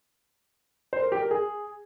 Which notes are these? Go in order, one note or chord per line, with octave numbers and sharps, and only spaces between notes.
C5
A#4
G4
A#4
G#4